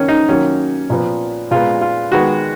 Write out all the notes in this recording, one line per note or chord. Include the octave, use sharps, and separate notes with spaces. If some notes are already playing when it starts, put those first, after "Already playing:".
Already playing: D#3 A#3 C#4
D#4
D#3 F#3 A#3 C#4
A#2 F3 B3
A#2 G#3 B3 F4
F4
D#3 G#3 B3 F#4